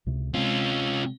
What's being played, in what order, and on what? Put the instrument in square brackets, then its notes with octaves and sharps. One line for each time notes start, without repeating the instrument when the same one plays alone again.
[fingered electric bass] C#2 C3
[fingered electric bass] C3 G#3 C4 [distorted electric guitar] C#4 F4